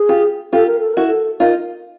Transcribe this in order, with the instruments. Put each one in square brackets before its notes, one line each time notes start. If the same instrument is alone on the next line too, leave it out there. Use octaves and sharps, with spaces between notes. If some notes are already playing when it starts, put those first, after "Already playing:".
Already playing: [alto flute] G#4
[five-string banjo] F4 G4
[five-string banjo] F4 G4 [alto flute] A4
[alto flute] A#4
A4
[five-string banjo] E4 F#4 [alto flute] A#4
[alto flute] A4
[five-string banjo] D#4 F4 [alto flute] A#4